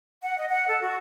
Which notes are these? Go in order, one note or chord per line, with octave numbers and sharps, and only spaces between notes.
F#5
D#5
F#5
A4
F#4